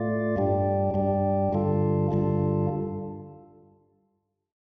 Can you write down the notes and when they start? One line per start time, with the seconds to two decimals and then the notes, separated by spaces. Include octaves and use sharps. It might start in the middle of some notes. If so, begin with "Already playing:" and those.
Already playing: A2 A3 F4 D5
0.36 G2 G3 D4 G4
0.94 G2 G3 D4 G4
1.53 G2 D3 G3 F4 A4
2.11 G2 D3 G3 F4 A4